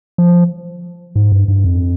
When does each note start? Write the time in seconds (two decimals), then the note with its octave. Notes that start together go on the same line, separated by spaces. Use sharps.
0.18 F3
1.16 G#2
1.32 G2
1.48 G2
1.64 F2